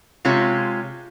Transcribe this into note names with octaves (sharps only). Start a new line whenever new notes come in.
C3 G#3 F4 C#5